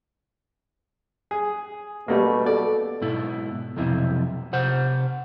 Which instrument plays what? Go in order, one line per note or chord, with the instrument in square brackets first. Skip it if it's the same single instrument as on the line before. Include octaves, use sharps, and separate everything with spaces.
[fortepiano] G#4
[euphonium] B2 [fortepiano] G3 A3 A#3
[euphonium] A4 [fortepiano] D5
[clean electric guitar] G#2 B2 E4
B1 F2 C3 E4
C3 C5 F#5